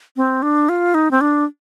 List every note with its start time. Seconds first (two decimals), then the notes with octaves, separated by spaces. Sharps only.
0.17 C4
0.42 D4
0.69 F4
0.94 D#4
1.11 C4
1.21 D4